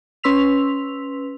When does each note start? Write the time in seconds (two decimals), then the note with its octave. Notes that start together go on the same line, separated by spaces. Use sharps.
0.23 C#4 B4 C6 E6 B6 F7